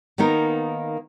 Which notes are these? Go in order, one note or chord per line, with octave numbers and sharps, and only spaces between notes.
D#3 A#3 B3 D#4 A#4